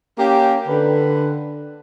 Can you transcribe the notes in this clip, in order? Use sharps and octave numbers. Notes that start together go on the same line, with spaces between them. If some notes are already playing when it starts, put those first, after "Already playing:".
A#3 C#4 G4
D3 B4